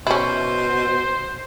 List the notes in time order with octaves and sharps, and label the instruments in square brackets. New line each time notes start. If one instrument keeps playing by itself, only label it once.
[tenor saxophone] B2 [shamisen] C#4 E4 [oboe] C5